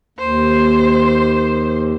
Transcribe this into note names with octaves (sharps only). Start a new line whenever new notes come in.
D#2 C5